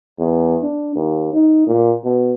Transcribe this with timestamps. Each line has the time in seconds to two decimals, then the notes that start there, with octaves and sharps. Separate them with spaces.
0.19 E2
0.63 D4
0.96 D#2
1.34 D#4
1.67 A#2
2.04 B2